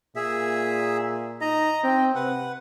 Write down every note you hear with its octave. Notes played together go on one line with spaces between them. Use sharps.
A#2 G#4 E5
D#4 D#5 A#5
C4 G5
C3 B4 F#5